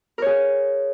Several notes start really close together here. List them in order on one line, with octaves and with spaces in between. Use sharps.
A#4 C#5 G#4